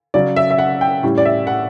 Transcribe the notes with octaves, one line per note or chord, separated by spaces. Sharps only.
C#3 F#3 C#4 D5
E5
E5
F#5
G5
A2 G3 C#4
D5
E5
F#5